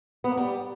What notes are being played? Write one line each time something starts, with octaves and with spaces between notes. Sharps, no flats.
B3
A#3
G3